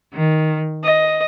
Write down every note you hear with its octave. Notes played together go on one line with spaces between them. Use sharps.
D#3
D#5